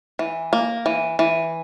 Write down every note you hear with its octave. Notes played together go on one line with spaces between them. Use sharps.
E3
A#3
E3
E3